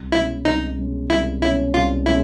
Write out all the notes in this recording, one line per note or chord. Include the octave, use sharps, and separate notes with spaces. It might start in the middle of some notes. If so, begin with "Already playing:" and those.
Already playing: C2
B2 G#3 C#4 E4
C2 D#4
B2 G#3 C#4
C2 E4
B2 G#3 C#4 E4
C2 F4
B2 G#3 C#4 E4